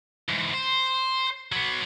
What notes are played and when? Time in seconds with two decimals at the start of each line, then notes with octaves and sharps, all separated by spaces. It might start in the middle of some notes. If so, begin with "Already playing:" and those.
0.29 E2 G#2
0.54 C5
1.52 F#3 B3